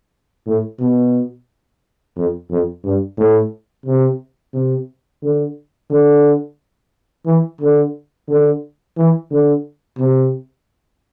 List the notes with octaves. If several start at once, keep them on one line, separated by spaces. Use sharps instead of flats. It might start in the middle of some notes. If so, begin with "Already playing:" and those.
A2
B2
F2
F2
G2
A2
C3
C3
D3
D3
E3
D3
D3
E3
D3
C3